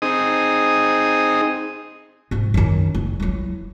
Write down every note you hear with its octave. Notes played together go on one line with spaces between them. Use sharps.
C4 D#4 G#4 D#6
G#2 F3
F#2 D#3
F#1
F#3 E4